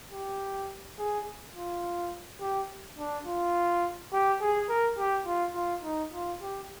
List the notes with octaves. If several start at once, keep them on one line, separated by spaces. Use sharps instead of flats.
G4
G#4
F4
G4
D4
F4
G4
G#4
A#4
G4
F4
F4
D#4
F4
G4